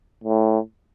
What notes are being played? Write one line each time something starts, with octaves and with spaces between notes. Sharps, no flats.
A2